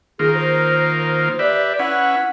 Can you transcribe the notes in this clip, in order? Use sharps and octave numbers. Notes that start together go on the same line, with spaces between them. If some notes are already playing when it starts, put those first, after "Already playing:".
D#3 A#3 F4 G#4
C5
C5
G4 B4 D5 E5
C#4 E4 B4 F#5